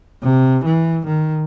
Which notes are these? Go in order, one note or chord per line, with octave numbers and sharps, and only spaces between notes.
C3
E3
D#3